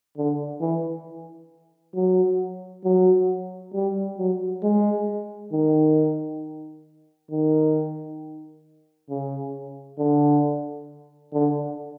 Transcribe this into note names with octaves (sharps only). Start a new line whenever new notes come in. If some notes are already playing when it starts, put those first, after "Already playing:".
D3
E3
F#3
F#3
G3
F#3
G#3
D#3
D#3
C#3
D3
D3